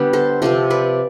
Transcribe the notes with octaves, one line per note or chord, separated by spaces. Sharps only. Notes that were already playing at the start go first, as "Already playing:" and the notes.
Already playing: D3 G3 B3 G4 D5
A4 C5
C3 F3 C4 A4 C5
B4 D5